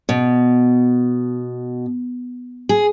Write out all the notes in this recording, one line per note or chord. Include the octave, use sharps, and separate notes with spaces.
B2
G#4